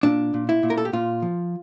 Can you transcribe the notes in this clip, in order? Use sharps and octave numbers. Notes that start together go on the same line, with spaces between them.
A#2 D4
A#2
E4
A#2
A#4
A4
G4
A#2 F4
F3